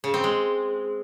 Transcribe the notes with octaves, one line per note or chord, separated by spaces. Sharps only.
C#3
C4
G#3